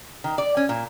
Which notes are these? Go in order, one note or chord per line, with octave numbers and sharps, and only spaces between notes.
D#3
D5
C#4
A#2